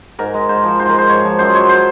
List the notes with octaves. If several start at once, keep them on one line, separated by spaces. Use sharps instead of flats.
G#2 A#4
G#3
G#2 C5
F3
G#2 C5
A#4
G#3 C5
G#2 C#5
F3
F#2 C5
G#3 C#5
C5